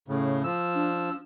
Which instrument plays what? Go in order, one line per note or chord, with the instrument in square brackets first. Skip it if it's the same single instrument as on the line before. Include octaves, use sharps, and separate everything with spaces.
[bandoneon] A2 C#3
F3 E6
[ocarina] D4